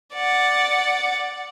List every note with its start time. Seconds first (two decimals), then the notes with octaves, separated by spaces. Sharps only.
0.14 D5 F#5